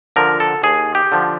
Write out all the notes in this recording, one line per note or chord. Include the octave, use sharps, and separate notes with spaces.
D3 F3 A#4
A4
D#2 G#4
G4
D3 F3